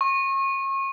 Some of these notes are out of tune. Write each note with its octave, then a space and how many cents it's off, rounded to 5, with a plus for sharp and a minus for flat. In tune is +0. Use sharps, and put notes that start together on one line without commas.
C#6 -35